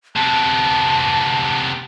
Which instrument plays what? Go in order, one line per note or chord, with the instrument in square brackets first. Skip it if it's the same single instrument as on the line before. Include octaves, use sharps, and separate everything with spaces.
[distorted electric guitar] C3 B3 [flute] A5